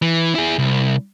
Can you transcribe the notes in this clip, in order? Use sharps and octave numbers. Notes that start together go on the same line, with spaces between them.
E3
E4 G#4
C2